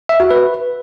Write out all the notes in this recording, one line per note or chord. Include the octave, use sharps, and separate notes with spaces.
E5
F#4
B4